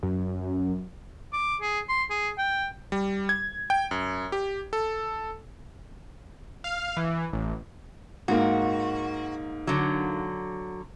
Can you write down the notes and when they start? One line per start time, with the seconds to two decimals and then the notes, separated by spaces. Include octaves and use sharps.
0.03 F#2
1.33 D6
1.62 G#4
1.89 C6
2.10 G#4
2.38 G5
2.92 G3
3.29 G#6
3.70 G5
3.91 F#2
4.32 G4
4.73 A4
6.64 F5
6.97 E3
7.33 A1
8.28 G#2 A#3 F#4
9.67 D3 F#3